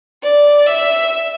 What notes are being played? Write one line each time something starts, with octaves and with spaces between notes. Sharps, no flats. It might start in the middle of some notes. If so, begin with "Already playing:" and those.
D5
E5